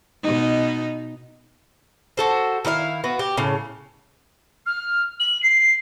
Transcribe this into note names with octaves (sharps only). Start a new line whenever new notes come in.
B2 D#4
F#4 A4 C5
D#3 E4 D5 F5
B3 F#4 B4
G4
A2 C#3
F6
F#7
C7